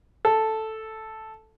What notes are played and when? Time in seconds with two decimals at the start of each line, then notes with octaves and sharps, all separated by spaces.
0.25 A4